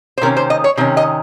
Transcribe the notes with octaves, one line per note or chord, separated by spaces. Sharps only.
C5
C3 D#3 A#3 C#4 A#4
C5
D#5
C#5
C3 D#3 C#4
D#5